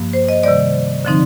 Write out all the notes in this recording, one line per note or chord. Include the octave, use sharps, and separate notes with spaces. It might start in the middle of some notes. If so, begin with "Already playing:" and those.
Already playing: G2 F3 A#3
C5
D#5
C3 D#3 G3 D5
D3 F3 C4 D#4